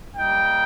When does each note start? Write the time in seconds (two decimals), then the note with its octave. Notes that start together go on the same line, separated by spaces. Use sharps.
0.17 G3 A#3 D#4 G5